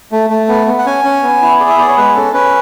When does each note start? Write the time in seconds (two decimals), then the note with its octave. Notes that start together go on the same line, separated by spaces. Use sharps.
0.12 A3
0.30 A3
0.48 B3
0.67 B3
0.79 F#5
0.86 C#4 G#5
1.05 C#4
1.23 B3
1.42 E4
1.60 G#4 D5
1.69 E5
1.78 B3 D5
1.88 C#5
1.97 G#3 B4
2.15 C#4 A4
2.33 C#4 B4